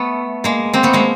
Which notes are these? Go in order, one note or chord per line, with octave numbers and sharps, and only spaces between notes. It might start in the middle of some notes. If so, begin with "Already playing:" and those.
Already playing: A3 B3
G#3 A#3
A#3 C4
A3 B3
G#3 A#3